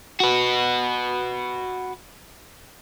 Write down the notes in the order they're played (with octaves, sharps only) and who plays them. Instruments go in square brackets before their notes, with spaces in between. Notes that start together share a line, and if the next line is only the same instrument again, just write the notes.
[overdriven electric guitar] F#4 B4